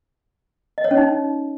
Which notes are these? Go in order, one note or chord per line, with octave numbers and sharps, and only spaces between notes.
D#5
C#5
C#4
D#4